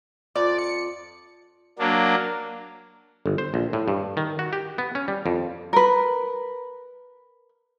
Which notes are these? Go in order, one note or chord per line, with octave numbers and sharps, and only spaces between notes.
F2 D5
C#7
F#3 A#3 D4
G1
C5
A#1
A2
G2
D#3
F#4
G4
B3
C#4
G3
F2
A#4 B4